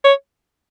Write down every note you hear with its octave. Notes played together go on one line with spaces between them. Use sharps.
C#5